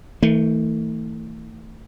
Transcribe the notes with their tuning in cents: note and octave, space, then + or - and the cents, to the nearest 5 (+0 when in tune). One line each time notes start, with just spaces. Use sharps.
E3 -45 A3 +25